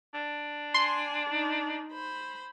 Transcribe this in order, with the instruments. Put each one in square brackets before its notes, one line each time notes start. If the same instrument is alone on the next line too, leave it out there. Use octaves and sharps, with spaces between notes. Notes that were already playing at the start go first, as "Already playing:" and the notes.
[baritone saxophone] D4
[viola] G#5 [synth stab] C6
[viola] D#4
C5 B5